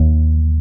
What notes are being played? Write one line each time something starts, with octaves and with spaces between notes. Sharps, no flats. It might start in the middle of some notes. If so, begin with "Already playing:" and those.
Already playing: D#2